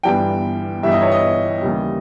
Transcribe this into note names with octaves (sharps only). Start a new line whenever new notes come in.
G1 G2 E3 G3 B3 G5
G1 G2 E3 G3 B3 E5
D#5
C#5
D#5
D#2 C#3 E3 G3